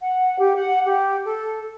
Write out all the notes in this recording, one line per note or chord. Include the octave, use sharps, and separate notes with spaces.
F#5
G4
F#5
G4
A4